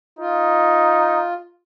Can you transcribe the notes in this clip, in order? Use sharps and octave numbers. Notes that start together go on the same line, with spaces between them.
D#4 F4